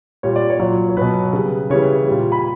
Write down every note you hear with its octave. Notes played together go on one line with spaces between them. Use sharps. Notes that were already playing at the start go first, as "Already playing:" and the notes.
A#2 G3 C#5
D5
C#5
A#2 F#3
C#5
B2 F#3 B4
C#3 G3
C#3 E3 G3 C#5
A#2 G3
B5